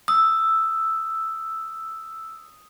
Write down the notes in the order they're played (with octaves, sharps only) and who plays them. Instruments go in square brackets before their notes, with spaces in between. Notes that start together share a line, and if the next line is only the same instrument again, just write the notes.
[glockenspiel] D#6 [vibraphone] E6